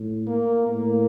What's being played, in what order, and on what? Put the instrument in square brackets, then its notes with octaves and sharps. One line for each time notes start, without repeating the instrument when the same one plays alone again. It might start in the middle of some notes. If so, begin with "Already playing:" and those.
Already playing: [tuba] A2
[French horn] A#3
[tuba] A2 [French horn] A#3